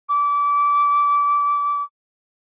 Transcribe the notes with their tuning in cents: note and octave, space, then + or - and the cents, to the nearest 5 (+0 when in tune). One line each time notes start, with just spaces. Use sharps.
D6 -25